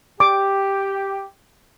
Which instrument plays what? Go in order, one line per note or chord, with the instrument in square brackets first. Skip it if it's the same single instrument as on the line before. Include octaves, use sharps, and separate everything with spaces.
[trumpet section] G4 [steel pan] D6